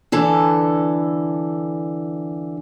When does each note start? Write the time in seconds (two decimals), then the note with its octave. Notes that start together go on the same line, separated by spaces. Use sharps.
0.12 D3 E3 A4